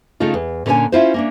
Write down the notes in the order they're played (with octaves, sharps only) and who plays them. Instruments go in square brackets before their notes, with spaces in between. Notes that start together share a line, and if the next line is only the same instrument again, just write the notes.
[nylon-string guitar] C#3 A3 D#4 F4
E2
A#2 D3 C#4 F4 C#5 G#5
C#4 E4 F4 C5
A#3 C#4 D4